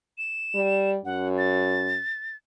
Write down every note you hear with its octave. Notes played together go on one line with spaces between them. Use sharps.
E7
G3
F#2 F#5
A6